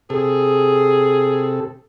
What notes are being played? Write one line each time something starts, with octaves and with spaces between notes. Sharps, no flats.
C3 G#4 A4